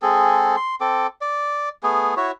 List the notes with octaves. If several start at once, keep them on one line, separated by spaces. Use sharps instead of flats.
G#3 C4 G#4 A4
C6
C4 A4 D6
D5
A3 B3 G#4
E4 F#4 C#5